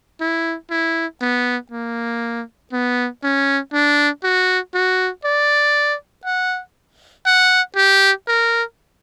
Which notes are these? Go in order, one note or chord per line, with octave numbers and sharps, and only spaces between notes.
E4
E4
B3
A#3
B3
C#4
D4
F#4
F#4
D5
F#5
F#5
G4
A#4